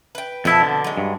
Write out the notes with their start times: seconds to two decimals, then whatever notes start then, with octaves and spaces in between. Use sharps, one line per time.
0.15 B4 G5
0.45 F2 B2 B3 E4 A5
0.62 D3
0.84 F#3 G#3
0.98 G2